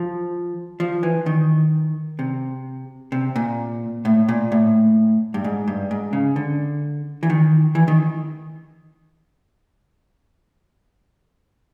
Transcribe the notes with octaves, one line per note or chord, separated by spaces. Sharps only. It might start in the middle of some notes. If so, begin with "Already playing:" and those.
Already playing: F3
F3
E3
D#3
C3
C3
A#2
A2
A#2
A2
G2
G#2
G2
G#2
C#3
D3
E3
D#3
E3
D#3